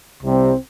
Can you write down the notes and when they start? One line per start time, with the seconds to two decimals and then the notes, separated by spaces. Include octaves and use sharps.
0.23 C2 C3 G3 C4